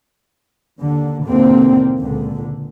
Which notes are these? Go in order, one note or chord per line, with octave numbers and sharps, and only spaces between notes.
D#2 D3
D#2 B2 D3 E3 A#3 C4
C#2 A#2 D3